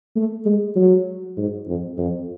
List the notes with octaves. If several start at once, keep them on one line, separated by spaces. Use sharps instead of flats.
A3
G#3
F#3
G#2
F2
F2